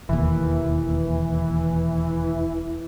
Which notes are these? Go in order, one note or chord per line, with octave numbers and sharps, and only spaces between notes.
E1 D#2 E3